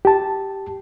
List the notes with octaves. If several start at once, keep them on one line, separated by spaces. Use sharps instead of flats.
G4 A5